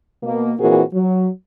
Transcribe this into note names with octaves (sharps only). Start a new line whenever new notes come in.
B2 A#3
A#2 E3 C4 F#4 G#4 A#4
F#3